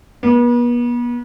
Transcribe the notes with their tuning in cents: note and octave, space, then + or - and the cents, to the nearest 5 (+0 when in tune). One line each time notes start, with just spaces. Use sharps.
B3 -40